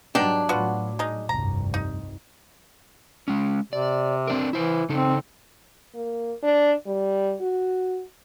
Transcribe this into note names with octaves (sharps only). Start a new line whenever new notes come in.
G#2 F#3 G3 B3 D4 D#4 G5
A2 F#3 B3 F4 F#4
G#3 D#4
F1 C2 G2 A#5
D#4
G#3 C#4
C3 D5
C4 D4 A#4
E3 E4 C5
C#3 C4 D#4 A4
A#3
D4
G3
F#4